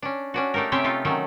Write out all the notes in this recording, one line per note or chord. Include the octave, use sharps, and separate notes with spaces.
C#4 D4
C#4 D4 F#4
A3 D4 D#4 G4 A#4
C3 C4 C#4 G4 E5 G5
A3 D#4 F4
D#3 F#3 A3 C#4